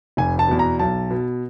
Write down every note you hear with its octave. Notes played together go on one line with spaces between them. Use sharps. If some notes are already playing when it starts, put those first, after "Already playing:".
F1 G#5
A5
E2 B2
A#5
B1 A5
B2